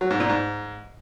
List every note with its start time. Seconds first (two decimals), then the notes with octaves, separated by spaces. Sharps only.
0.01 F#3
0.10 G#2
0.20 A#2
0.30 G#2